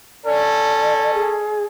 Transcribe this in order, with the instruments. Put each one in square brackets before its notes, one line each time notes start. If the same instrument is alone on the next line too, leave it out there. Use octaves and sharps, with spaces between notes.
[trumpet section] C#4 A4 [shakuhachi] D5
[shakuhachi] G#4